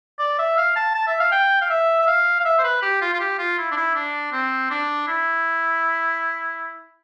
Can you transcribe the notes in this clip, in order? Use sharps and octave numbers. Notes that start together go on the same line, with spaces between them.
D5
E5
F5
A5
A5
E5
F5
G5
F5
E5
E5
F5
F5
E5
C5
B4
G4
F4
F4
G4
F4
E4
D4
E4
D4
C4
D4
E4